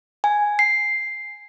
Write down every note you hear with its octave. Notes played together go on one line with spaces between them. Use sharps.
G#5
C7